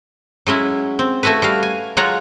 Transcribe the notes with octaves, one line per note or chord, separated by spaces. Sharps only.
F#3 G#3 C#4 E4
C4
A3 E4 F#4 A4 B4
G3 F#4 F5
G#5
F#3 G#3 F4 C#5 F#5 A#5